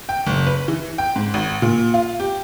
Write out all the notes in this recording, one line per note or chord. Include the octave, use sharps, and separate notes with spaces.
G5
F#1
B4
E3
G5
G#2
G#1
A#2
F4
G4